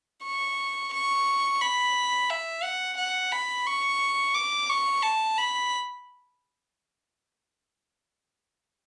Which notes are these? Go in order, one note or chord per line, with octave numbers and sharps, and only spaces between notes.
C#6
C#6
B5
E5
F#5
F#5
B5
C#6
D6
C#6
A5
B5